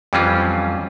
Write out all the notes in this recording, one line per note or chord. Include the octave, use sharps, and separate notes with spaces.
F2 E3 F#3 G3 C#4 F4